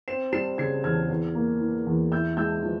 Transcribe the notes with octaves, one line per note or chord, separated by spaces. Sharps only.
C4 C7 E7
G3 C7 E7
C#3 G#6 C7
E2 F6 G#6
E2
A#3
E3
E2
E4 E6 G6
G#3 E6 G6
F3